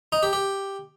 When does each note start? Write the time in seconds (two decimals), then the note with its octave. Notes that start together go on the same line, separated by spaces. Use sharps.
0.12 D#4
0.23 G4
0.33 G4